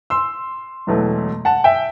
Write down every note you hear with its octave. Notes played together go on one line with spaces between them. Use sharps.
C6 E6
E1 E2 B2 F#3 A3
F#5 A5
E5 G5